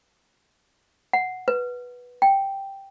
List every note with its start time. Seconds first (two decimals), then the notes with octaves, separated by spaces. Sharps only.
1.13 F#5
1.48 B4
2.22 G5